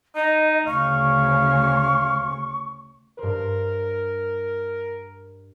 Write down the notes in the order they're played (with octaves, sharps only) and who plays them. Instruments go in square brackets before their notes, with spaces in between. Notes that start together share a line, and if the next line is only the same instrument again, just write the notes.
[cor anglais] D#4 [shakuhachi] D#5
[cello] D2 C#3 [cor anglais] F5 [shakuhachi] C#6
[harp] G2 C5 [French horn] A#4